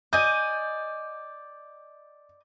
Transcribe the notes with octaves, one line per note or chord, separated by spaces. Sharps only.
D5 D#5 G#5 G6